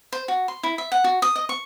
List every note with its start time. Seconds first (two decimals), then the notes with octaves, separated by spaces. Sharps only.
0.13 C5
0.28 F#4
0.48 C6
0.63 E4
0.78 E5
0.92 F#5
1.04 F#4
1.22 D#6
1.36 D#5
1.49 C#6